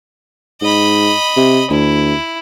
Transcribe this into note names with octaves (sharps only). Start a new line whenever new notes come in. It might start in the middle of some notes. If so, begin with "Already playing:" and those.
G#2 D#5 B5
C3
D2 E4